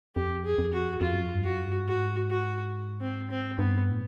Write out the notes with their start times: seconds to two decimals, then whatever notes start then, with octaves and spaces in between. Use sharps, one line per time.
0.15 F2 G4
0.45 G#4
0.58 F2
0.73 F#4
1.01 F2 F4
1.13 F#2
1.23 F2
1.34 G2
1.44 F#2 F#4
1.66 G2
1.87 G#2 F#4
2.30 F#4
3.01 C4
3.31 C4
3.59 G2 B3
3.91 A2